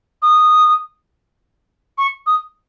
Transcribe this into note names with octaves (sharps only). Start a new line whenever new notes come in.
D#6
C#6
D#6